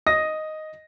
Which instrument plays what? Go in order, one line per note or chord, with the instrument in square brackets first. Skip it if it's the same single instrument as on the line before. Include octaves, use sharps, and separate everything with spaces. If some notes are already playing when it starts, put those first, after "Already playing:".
[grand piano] D#5 D#6 A#6